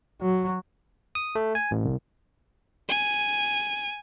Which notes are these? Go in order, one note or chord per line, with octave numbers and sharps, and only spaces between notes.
F#3
D#6
A3
G#5
A1
C2
G#5